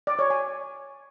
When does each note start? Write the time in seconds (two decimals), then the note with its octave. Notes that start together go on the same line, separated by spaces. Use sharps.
0.07 D5
0.19 C#5
0.30 G#5